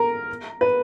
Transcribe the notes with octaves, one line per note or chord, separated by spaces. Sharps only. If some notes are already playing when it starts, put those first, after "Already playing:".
Already playing: A#4
B4